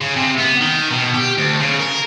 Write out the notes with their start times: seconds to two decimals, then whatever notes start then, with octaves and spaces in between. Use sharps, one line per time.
0.01 C#3
0.16 C3
0.39 B3
0.61 D#3
0.90 B2
1.14 G4
1.38 D2
1.60 C#3
1.79 A#4